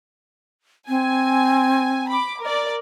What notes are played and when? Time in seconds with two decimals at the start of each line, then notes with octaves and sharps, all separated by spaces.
0.89 C4 G#5
2.09 B5 D6
2.41 A#4 D5